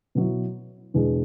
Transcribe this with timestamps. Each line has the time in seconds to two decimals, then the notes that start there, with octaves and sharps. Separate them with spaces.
0.15 B2 F#3 B3 E4
0.94 E2 B2 G#3 D4 G#4